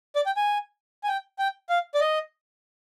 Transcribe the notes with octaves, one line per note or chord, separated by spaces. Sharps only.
D5
G5
G#5
G#5
G5
G5
F5
D5
D#5